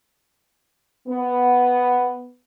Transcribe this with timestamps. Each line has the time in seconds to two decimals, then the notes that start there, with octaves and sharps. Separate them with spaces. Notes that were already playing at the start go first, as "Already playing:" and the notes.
1.08 B3